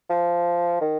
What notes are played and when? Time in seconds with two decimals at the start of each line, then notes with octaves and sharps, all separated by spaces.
0.10 F3
0.81 D#3